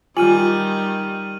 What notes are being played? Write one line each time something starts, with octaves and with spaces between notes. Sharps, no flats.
D#3 G3 F4 G#5 F6 D#7 F#7